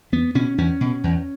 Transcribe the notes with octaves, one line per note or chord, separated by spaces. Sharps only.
E2 B3
B2 C#4
E2 C#4
B2
E2